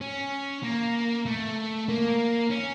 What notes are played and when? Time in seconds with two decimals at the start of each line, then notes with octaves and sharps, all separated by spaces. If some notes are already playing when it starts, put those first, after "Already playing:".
0.01 C#4
0.64 A#3
1.26 A3
1.89 A#3
2.51 C#4